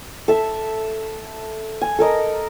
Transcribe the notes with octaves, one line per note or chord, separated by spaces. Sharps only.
A4 E5
G#5
A4 A#4 D#5